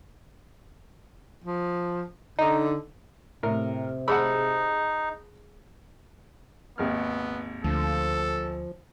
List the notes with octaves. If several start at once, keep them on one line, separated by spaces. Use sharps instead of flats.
F3
D3 D#4
A2 C3 A#4
D#4 G#4 C5 F#5 A5 B5 E6
G#1 D#2 B3 F6
D2 F3 A4